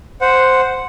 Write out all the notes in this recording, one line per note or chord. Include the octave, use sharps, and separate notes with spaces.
C5 F#5